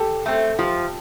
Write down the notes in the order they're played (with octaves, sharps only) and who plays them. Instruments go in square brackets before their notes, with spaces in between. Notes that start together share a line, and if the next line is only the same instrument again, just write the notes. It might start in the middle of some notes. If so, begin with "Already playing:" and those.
Already playing: [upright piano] G4 A4
[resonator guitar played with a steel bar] A3 C4
[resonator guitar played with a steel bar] F3 [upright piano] F4 G4